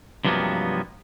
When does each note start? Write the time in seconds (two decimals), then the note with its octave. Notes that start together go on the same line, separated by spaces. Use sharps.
0.25 G2 C3 F3 F#3 A#3 B3